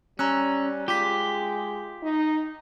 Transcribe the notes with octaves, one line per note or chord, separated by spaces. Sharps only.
G3 C#4 A#5 E6 F#6
G#3 F4 G4 D6 B6
D#4